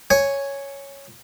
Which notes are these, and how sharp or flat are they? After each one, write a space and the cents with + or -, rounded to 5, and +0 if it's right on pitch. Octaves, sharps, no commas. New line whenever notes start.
C#5 +0 G#5 +0